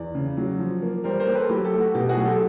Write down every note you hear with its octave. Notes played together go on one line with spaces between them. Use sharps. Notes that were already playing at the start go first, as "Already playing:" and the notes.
Already playing: E2 D5
C#3
F#3
F3
A#3
G3 A#4 C5
A#4 C5
A#3
A4 B4
F#3 G4
G4 A4
A3
F#4
B2 G4
F#4 G#4
F#3
G4 A4